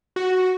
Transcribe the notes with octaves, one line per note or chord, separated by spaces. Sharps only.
F#4